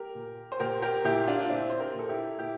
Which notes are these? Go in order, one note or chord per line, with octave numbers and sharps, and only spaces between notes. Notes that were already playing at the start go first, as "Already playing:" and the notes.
Already playing: G4 A#4
A#2
C5
A#2 G4 A#4
G4 A#4
A#2 E4 G4
D4 F4
D4
A#2 C4 E4
C5
G4 A#4
A#2 A4
E4 G4
A#2 E4 G4